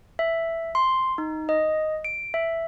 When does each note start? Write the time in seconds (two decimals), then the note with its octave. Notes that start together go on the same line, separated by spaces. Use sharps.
0.19 E5
0.75 C6
1.18 D#4
1.49 D#5
2.04 D7
2.34 E5